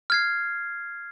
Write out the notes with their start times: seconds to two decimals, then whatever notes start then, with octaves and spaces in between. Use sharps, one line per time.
0.10 F6 G#6 C7